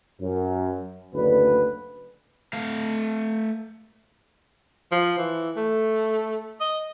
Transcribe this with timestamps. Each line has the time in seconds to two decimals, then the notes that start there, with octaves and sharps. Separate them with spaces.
0.21 F#2
1.14 F#1 D2 B4
2.54 A3 F5
4.91 F3
5.18 E3
5.57 A3
6.60 D#5